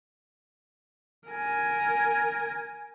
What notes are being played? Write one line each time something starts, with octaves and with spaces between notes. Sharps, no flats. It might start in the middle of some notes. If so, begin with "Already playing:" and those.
A#4 G#5